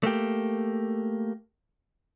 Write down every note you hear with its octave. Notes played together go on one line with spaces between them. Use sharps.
A3 A#3 G4